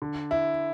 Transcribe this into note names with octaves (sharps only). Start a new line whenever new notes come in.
D3
E4